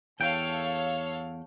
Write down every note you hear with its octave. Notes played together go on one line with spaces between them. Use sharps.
E2 A4 C#5 F5 G5